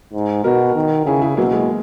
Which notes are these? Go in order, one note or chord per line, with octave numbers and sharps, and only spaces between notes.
G#2
B2 F#4 A#4
D#3
C#3 E4 G#4
E4 G#4
B2 F#3 A#3
G#3